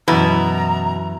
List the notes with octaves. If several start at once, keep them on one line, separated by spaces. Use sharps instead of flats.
F#2 B2 E3 E4 A#5